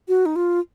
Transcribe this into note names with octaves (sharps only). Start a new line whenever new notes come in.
F#4
D#4
F4